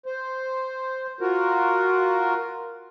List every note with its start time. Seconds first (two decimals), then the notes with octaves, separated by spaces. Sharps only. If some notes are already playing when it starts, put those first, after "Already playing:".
0.06 C5
1.21 F4 F#4 A#4